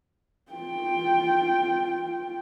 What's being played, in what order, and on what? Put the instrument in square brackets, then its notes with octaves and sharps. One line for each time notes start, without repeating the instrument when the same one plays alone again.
[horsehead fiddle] F4 G5